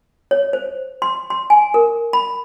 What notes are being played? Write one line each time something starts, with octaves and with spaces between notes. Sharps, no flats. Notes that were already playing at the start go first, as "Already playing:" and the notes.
C#5
C5
C6
C6
G#5
A#4
B5